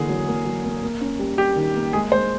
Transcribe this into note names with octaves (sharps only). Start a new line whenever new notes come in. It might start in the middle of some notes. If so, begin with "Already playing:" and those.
Already playing: D3 E3 A#3 G#4
F#3
A#3
F#3
A#3
A#3
C#4
G3
G3 G4
D#3
A#3
G#3 G#4
G#3 C5